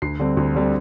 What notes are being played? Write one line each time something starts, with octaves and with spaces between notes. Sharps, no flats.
D2 C7
D3 G3 C4
D2
D3 G3 C4